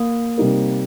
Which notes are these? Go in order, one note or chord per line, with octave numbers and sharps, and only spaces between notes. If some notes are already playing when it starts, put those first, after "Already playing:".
Already playing: A#3
C3 G3 D#4 A#4